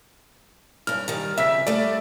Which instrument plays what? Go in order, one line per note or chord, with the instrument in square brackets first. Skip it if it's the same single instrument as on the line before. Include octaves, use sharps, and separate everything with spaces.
[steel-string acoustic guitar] G2 C#4 [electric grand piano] F6
[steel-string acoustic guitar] D#3 G3
[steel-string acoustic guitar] F2 C#3 [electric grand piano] E5 E6 B6
[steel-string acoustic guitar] G3 A3 A4 [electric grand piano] D5